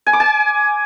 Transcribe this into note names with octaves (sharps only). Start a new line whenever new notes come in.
G#5
D6
G#5